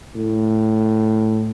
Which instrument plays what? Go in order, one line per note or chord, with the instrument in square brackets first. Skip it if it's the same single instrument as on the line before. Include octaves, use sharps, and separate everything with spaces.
[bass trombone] A2